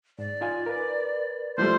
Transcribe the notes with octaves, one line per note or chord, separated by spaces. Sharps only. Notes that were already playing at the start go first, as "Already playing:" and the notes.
G#2 D5
D#4 F4 G#5
A#4 B4
F3 G3 A3 C5